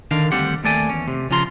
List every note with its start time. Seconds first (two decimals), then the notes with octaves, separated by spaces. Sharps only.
0.11 D3 D#3 D4 A#4 F5
0.32 D2 G3 C4 G4 F#5
0.64 D#2 A3 D5 G#5
0.89 E2 C#4
1.08 C3
1.31 C#3 F3 F4 A#5 C6